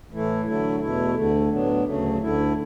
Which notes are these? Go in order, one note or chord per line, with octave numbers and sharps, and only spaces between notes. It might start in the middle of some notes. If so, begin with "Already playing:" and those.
A2 E3 A3 E4
D3 F#3 A3 E4
E2 B2 A3 E4
D2 D3 A3
A2 F#3 B3 D4
D2 C#3 F#3 A3
D2 D3 A3 E4